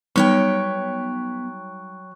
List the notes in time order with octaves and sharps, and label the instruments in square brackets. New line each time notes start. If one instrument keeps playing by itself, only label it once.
[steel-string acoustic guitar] F#3 C#5 G5 [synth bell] G3 D#4 [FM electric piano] B3 [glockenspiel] C#6 F#6